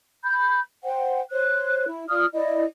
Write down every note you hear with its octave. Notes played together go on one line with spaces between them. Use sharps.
B5 G6
C5 F#5 G5
C5 C#5 F#6
E4
F4 D5 D#6 F6
E4 D5 D#5